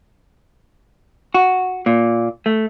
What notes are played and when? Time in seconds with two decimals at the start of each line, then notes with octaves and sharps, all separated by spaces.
1.34 F#4
1.86 A#2
2.46 A3